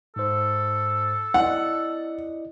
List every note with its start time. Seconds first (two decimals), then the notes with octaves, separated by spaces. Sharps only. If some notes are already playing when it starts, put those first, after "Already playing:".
0.16 G#2 A4 C5
1.34 E4 D5 D#5 F#5